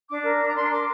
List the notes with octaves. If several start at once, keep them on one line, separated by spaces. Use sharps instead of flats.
D4 D6
A#4
D4 D6
A#5
D4 C6
A#4 D6